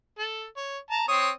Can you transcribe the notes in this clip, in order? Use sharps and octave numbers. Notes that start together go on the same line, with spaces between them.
A4
C#5
A5 A#5
C4 C#5 D#6